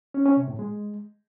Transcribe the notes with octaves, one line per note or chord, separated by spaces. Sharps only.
C#4
C#4
C3
A2
G#3